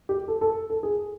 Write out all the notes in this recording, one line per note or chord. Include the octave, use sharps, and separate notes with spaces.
G4
A4
A4
A4
G#4